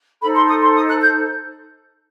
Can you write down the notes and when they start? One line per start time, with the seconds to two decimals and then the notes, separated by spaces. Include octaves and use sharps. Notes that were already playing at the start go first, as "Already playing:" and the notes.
0.21 D#4 A4 C5 B5
0.35 C6
0.48 D#6
0.61 C6
0.75 D#6
0.87 F#6
1.01 G6